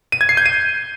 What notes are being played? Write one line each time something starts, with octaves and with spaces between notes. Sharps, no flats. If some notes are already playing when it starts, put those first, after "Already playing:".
D#7
G#6
C7
G6
D#7